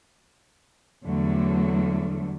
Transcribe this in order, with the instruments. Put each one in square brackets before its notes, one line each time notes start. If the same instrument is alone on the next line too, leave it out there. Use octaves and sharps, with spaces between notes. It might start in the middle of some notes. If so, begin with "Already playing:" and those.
[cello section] E2 D3 F#3 G3 A3